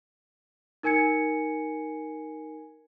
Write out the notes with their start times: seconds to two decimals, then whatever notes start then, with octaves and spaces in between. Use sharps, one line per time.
0.83 D#4 A#4 G#5 G#6 C#7